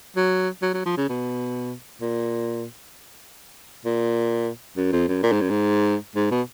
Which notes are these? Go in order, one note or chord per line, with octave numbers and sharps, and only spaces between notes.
F#3
F#3
F#3
F3
C#3
B2
A#2
A#2
F#2
F2
F#2
A#2
G#2
F#2
G#2
G#2
B2